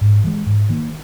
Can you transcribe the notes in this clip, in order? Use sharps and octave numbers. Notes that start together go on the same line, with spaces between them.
G#2
E3 G#3
G#2
D#3 A#3